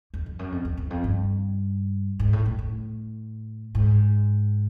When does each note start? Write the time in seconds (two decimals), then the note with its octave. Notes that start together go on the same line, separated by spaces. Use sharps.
0.14 F2
0.26 F2
0.39 F#2
0.52 F2
0.65 F2
0.77 E2
0.90 F2
1.04 G2
2.19 G#2
2.33 A2
2.46 A2
2.59 A2
3.75 G#2